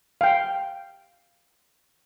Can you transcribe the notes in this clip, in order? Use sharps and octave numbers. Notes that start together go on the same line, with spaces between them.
F5 G5